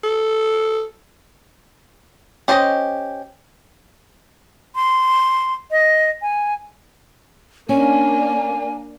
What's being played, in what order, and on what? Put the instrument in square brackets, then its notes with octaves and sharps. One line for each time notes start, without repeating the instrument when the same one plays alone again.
[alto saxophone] A4
[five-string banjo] C#4 G4 C5 D5 D#5
[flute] C6
D#5
G#5
[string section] A#3 D4 [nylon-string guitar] C#4 [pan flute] G#5